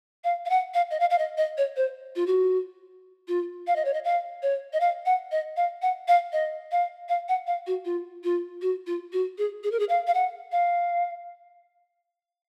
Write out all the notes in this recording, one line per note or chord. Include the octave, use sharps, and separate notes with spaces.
F5
F5
F#5
F5
D#5
F5
F5
D#5
D#5
C#5
C5
F4
F#4
F4
F5
D#5
C#5
D#5
F5
C#5
D#5
F5
F#5
D#5
F5
F#5
F5
D#5
F5
F5
F#5
F5
F#4
F4
F4
F#4
F4
F#4
G#4
G#4
A#4
G#4
F5
F5
F#5
F5